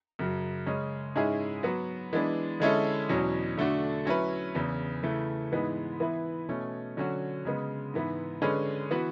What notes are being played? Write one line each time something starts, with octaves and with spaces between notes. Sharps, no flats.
F#2 C#3 F#3
C#3 G#3 C#4
G#2 G#3 C#4 E4 G#4
F#3 B3 F#4
E3 G#3 B3 D4
D3 G#3 C#4 E4 A4
E2 B2 F#3 C#4
D3 A3 D4 F#4
F#3 C#4 E4 B4
E2 C#3 E3
C#3 E3 A3
G#2 E3 G#3 B3
E3 B3 E4 B4
B2 A3 C#4
D3 F#3 C#4 F#4
C#3 G#3 B3
G#2 E3 B3 E4
D3 G#3 C#4 G#4 B4
E3 B3 F#4 B4